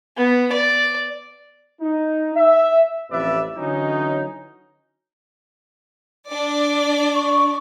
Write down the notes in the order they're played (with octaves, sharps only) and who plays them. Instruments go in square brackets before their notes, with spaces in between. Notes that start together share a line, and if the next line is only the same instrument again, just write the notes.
[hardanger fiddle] B3
D5
[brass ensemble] D#4
E5
A1 F2 C3 B4 D5 E5
D3 E3 F#3 C#4 D#4
[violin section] D4 D5
[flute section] C#6